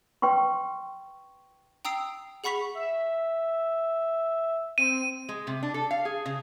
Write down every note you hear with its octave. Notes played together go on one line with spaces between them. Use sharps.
B4 G5 C6 C#6
G5 A#5 D#6 E6 C7 D7
G#4 F#5 B5 C#6 B6 F7
E5
C4 D#7
G#3
C3
D4
A4
F5
G#4
C#3